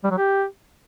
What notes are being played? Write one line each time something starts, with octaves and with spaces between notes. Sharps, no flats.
G3
F#3
G4